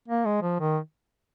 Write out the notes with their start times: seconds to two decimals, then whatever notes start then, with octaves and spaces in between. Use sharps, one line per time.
0.08 A#3
0.25 G#3
0.42 F3
0.60 D#3